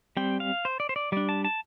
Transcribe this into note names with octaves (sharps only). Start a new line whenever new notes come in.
G3 C4 G5
F5
C5
D5
C5
D5
G3 D4 D5
A5
A5